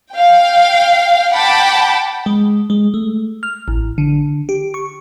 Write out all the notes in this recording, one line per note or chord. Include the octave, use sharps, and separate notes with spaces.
F5 G5
F#5 G5 A5 B5 D6
G#3
G#3
A3
F6
A1
D3
G4
C#6